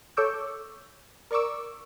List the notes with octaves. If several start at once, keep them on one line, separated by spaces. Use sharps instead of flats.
A4 C#5 C#6 D6 E6 G6
A#4 D5 C#6 D6 E6